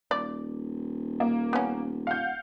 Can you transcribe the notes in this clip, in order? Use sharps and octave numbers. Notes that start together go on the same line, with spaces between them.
D#1 D5
A#3
B3 C#4
F5 F#5 G6